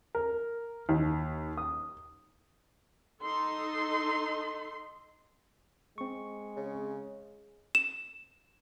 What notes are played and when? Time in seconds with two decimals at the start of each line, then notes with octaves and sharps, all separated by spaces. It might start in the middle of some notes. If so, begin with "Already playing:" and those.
0.15 A#4
0.89 D#2
1.57 D#6
3.23 D#4 A4 C6
5.98 G#3 C4 C#6
6.56 C#3
7.75 E7